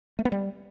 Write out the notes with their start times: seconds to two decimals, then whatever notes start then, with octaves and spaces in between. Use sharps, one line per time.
0.19 A3
0.25 B3
0.32 G3